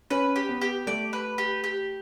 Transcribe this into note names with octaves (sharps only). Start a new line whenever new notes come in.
C#4 B4
G4
B3
G4
A3 D5
B4
G4
G4